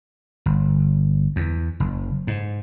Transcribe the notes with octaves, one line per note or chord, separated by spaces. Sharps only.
G1
E2
F#1
G#2